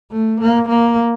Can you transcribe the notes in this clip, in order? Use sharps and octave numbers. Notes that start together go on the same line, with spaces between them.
A3
A#3
A#3